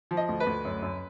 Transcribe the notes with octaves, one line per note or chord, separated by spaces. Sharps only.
F3
D#5
D2
B4
D2
F#2
F#2